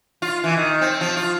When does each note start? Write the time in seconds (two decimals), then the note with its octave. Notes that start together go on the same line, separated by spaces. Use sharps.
0.22 F4
0.44 E3
0.57 D#3
0.81 C4
1.01 F3
1.17 F4